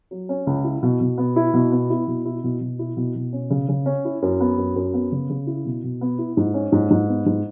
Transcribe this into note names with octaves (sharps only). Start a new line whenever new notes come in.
F#3
C#4
C#2
E4
B2
B2
B3
E4
B2
B3
E4
B2
E4
B2
B2
E4
B2
B2
C#4
C#3
C#3
C#4
E4
F#2
B3
F#2
F#2
B3
C#3
C#3
E4
B2
B2
B3
E4
G#2
C#4
G#2
G#2
B3
G#2